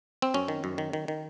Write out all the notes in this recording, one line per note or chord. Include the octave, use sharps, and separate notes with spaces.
C4
F#2 C#4
D#3
F#2
D#3
D#3
D#3